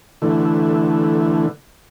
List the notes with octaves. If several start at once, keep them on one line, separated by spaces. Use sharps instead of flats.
D3 E3 A3